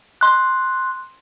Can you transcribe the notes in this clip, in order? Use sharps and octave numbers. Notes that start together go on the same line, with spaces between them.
C6 F#6